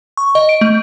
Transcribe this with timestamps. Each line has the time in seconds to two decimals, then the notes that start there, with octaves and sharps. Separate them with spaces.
0.17 C#6
0.35 D#5
0.49 D7
0.61 A3